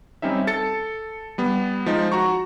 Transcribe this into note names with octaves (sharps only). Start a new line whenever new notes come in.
G3 C4 C#4 D#4 E5
A4 A6 C#7
G3 B3
F3 G#3 D#4
F#4 A#5 C#6